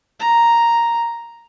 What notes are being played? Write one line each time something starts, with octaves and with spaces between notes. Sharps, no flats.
A#5